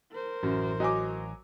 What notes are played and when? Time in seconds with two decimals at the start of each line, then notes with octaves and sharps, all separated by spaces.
0.12 A#4 C5
0.43 A1 F#2
0.80 F#3 D#5 G#5 D6